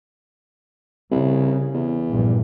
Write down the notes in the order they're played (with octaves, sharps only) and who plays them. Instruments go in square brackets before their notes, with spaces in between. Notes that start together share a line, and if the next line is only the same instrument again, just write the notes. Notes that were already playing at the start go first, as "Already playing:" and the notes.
[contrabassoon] C2 [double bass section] C#3
[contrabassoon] E2
[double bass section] A#1 G2 A#2